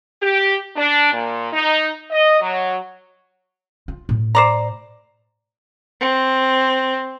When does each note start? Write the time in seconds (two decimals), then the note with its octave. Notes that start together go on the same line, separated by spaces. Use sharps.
0.21 G4
0.76 D4
1.12 A#2
1.52 D#4
2.11 D#5
2.41 F#3
3.88 F4
4.09 A2
4.35 C5 D5 A#5
6.01 C4